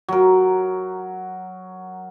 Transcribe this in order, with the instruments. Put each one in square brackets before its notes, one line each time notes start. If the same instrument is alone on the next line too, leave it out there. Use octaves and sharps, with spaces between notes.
[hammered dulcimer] F#3 A#4